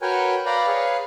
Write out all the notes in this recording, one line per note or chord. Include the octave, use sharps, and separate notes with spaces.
F#4 A#4 B4 C#5 G5 G#5
B4 D5 F5 G5 A#5 B5
G#4 B4 C#5 F5